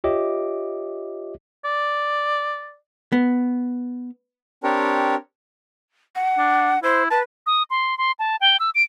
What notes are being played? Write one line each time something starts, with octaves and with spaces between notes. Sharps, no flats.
F4 G4 C#5 D#5 E5 D6
D5
B3
C4 D4 G4 A#4 C#5
F#5
D4
E4 C5
B4 A5
D#6
C6
C6
A5
G5
E6
D7